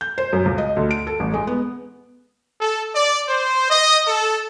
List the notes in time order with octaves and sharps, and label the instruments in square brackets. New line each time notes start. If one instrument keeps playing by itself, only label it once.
[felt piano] G6
C5
F#2
C#2
D#5
D2
D7
A4
A1
G#3
B3
[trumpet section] A4
D5
C5
D#5
A4